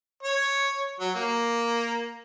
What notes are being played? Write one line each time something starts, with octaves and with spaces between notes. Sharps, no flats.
C#5
F#3
A#3